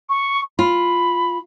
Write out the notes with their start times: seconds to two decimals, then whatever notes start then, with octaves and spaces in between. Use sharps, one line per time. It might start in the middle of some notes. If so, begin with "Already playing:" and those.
0.09 C#6
0.59 F4 B5